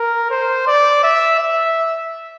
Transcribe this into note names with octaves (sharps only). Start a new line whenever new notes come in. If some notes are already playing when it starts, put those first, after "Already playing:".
Already playing: A#4
C5
D5
E5
E5